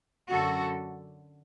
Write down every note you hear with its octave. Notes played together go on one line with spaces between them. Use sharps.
F#2 D3 F#4 A4